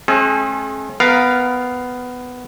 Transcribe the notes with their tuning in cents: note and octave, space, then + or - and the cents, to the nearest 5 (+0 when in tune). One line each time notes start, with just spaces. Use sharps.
G#3 +45 C#4 -45 G#4 +40
B3 +10 A#4 +10 F5 +0